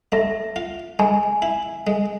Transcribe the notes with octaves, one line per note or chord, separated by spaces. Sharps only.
A3 E5
F4
G#3 G#5
E4
G#3